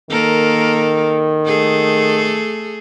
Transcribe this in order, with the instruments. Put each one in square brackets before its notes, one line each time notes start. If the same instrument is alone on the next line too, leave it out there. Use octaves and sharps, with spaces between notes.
[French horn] D#3 [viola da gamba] A#3 A4 A#4
[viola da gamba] A3 G#4 A4